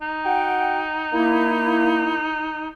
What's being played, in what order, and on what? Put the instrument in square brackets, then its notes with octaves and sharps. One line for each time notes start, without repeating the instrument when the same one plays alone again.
[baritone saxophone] D#4
[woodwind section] F#4 F#5 G5
A#3 E4